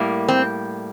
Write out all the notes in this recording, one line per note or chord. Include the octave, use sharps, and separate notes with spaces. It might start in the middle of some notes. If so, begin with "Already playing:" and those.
Already playing: A2 G3 A#3
C4